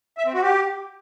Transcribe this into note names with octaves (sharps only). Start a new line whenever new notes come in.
E5
C4
F#4
G4